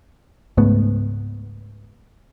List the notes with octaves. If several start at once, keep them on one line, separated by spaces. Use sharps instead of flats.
C#2 G#2 A3 B3